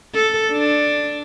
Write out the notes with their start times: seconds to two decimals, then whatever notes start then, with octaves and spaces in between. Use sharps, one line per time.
0.14 A4
0.52 D4